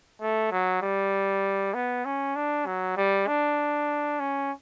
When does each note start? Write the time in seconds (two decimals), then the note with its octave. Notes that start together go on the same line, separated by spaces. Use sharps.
0.22 A3
0.52 F#3
0.82 G3
1.74 B3
2.05 C#4
2.36 D4
2.66 F#3
2.97 G3
3.27 D4
4.20 C#4